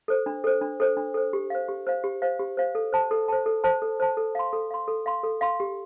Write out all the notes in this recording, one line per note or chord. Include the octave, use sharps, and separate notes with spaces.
A4 C5
D4
A4 C5
D4
A4 C5
D4
A4 C5
G4
C5 F5
G4
C5 F5
G4
C5 F5
G4
C5 F5
A4
C5 A5
A4
C5 A5
A4
C5 A5
A4
C5 A5
A4
F5 C6
A4
F5 C6
A4
F5 C6
A4
F5 C6
G4